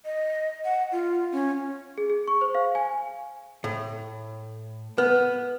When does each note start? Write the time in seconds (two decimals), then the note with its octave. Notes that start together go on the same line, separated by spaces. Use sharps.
0.05 D#5
0.65 F#5
0.92 F4
1.32 C#4
1.98 G#4
2.10 G#4
2.28 C#6
2.41 C5
2.55 F5
2.75 G#5
3.64 A2
4.98 B3 B4